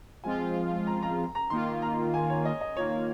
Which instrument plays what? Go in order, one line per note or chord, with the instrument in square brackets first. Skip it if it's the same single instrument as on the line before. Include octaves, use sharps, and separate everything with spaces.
[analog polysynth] F3 G#3 C4 F4 [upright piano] G#5
[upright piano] A#5
A#5
A#5
[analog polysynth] D#3 A#3 F4 [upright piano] C6
[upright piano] A#5
G#5
C#5
D#5
D#5
[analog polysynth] D#3 A#3 F4 [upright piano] C#5